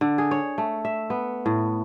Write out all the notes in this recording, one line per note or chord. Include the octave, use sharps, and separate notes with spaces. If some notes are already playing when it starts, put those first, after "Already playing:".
D3
G#4
C#5
A3
E5
B3
A2